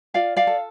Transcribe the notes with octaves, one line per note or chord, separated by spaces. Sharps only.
F4 D5 F5
D5 F5
A4